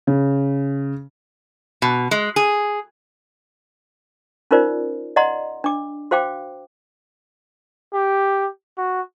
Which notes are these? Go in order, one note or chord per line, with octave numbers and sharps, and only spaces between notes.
C#3
B2
G#3
G#4
C#4 D#4 F4 A#4 C5 D5
D5 D#5 F#5 A#5 C6
D4 D6
F#4 C5 F5 G5 D6
G4
F#4